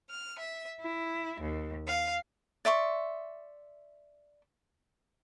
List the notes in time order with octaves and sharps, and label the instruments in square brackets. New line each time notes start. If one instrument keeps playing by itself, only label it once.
[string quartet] F6
E5
E4
D#2
F5
[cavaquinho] D5 E5 C6 C#6